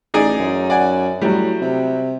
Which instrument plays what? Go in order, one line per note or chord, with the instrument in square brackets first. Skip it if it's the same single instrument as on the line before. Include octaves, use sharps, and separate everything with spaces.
[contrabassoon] A1 [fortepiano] D#4 G#4 D5
[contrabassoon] F#2
[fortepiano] D5 F#5 G#5
[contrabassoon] A2 [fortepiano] F#3 G3
[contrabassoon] C3